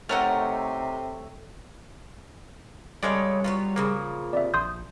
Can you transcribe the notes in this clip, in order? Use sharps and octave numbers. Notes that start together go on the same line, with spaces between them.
C3 A3 D#4 A#4 C#5 F#5 F6
C#3 G3 G#3 C#4 A4 C#5 D5
F#3 B3 F4 C#5
A#2 C#3 F3 A#3
C3 D5 E5
A#1 C6 D#6 G6